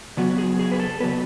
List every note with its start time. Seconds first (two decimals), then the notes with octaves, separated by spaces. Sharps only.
0.17 C#3 F#3 B3 F#4
0.38 G#4
0.59 G#4
0.71 B4
0.79 A4
1.00 C#3 F#3 B3 B4